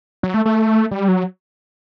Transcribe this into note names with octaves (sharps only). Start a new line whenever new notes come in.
F#3
A3
A3
G3
F#3